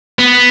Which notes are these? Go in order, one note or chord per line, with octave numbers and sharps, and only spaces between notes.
B3